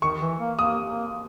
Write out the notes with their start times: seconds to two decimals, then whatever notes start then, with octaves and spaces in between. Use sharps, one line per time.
0.02 D#3 C#6
0.21 E3
0.40 A#3
0.58 A#3 D#6
0.86 A#3